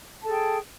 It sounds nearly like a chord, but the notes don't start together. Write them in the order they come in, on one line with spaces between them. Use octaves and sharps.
A5 A4 G#4 G5